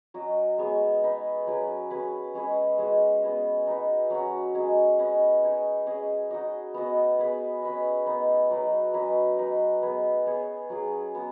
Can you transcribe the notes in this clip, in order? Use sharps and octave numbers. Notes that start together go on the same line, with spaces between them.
F#3 C#4 F#4 D#5
G#3 B3 G#4 C#5
D#4 B4 D#5
F#3 C#4 G#4 B4
C#4 G#4 B4
G#3 C#4 G#4 B4
G#3 C#4 F#4
B3 G#4 D#5
D#4 F#4 B4
F#3 C#4 F#4
G#3 C#4 G#4 D#5
C#4 B4 D#5
D#4 G#4 C#5
C#4 G#4 D#5
D#4 F#4 D#5
B3 F#4 B4 D#5
B3 G#4 B4 D#5
C#4 B4 D#5
B3 D#4 B4
F#3 D#4 B4 D#5
F#3 C#4 B4 D#5
D#4 B4 D#5
B3 G#4 B4 D#5
B3 G#4 C#5
F#3 C#4 G#4
B3 F#4